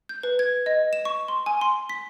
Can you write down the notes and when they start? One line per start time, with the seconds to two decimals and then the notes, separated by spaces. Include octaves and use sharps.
0.09 G6
0.23 B4
0.39 G#6
0.66 D#5
0.93 E7
1.05 C#6
1.28 C6
1.46 G#5
1.61 C6
1.89 B6